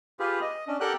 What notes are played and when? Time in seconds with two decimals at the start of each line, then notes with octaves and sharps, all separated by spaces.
0.19 F4 G4 G#4 B4
0.42 D#5
0.68 C#4 D4
0.80 G4 A4 A#4 F#5 G5 F#6